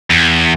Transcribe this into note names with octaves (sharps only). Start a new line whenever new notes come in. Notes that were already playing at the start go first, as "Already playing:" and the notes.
E2